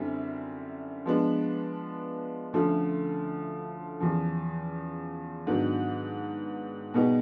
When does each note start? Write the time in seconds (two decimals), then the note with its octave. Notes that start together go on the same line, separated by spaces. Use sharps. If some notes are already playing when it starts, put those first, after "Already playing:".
Already playing: F#2 D3 G3 C4 E4
1.06 F3 G#3 B3 D4
2.53 D2 D3 F3 A3 C#4
4.00 E2 C#3 F3
5.47 G#2 D#3 F#3 B3 D4
6.94 B2 G3 B3 D#4 G#4